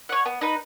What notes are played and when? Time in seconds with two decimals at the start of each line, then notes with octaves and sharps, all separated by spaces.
0.09 C#5 F#5
0.25 B3
0.41 D#4 B4